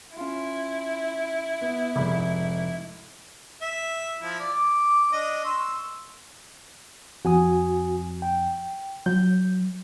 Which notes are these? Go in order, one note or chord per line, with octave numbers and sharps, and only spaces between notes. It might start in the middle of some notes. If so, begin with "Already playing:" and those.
C#4 E4 F4
B3
F1 G#2 B5
E5
F3 E4
D5
D6
D4 D#5
C6 C#6 E6
F2 F#4 G#5 D#6
G5
F#3 G6